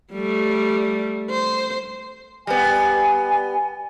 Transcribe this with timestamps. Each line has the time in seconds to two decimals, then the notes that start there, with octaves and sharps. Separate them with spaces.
0.13 G3 A3
1.30 C5
2.47 G3 B3 G#5